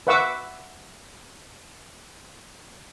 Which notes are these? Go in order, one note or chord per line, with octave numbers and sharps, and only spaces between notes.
B4 E5 F#5 C#6 D6 E6